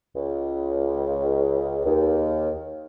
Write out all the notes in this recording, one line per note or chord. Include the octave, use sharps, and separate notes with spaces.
C#2
D#2